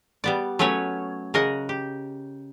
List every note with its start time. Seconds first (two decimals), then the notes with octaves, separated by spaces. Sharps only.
0.24 G3 B3 D5
0.59 F#3 A3 C#4 B4 C#5
1.34 C#3 A#4 D#5 F#5
1.69 G4